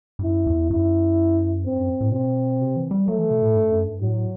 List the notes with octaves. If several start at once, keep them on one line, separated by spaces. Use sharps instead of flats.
G2
F#2 E4
E2
F#2 E4
G2 C4
F#2
A2
B2 C4
C3
E3
G3
F#3 A3
E3
B2
A2
G2
F#2
G2
A2 F#3